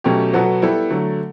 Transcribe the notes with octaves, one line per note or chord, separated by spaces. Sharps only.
B2 F#3 A3 C#4 G4
B2 F#3 B3 F#4 A4
G3 B3 E4 A4
D3 F#3 A3